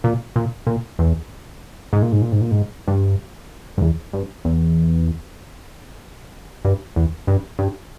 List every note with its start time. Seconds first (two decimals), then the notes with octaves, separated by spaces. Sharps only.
0.04 A#2
0.36 A#2
0.67 A#2
0.99 E2
1.93 G#2
2.02 A#2
2.12 G#2
2.22 A#2
2.32 G#2
2.41 A#2
2.51 G#2
2.88 G2
3.78 G2
3.82 E2
4.13 G2
4.45 E2
6.65 G2
6.96 E2
7.27 G2
7.59 G2